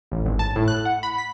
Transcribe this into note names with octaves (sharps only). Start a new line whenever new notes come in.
A1
G#1
A5
A2
F#6
F#5
B5
B6